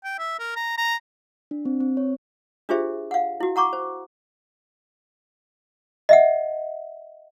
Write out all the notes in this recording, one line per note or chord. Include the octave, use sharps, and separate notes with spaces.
G5
E5
A#4
A#5
A#5
D4
C4
C4
C#5
D4 F4 G4 G#4 C5 E5
F5 F#5
E4 F#4
F#5 A#5 C#6 D6
C5
D#5 E5 F#5